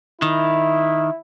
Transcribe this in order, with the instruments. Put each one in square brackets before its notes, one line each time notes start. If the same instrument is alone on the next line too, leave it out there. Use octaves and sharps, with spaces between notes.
[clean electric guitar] D#3 [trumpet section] E4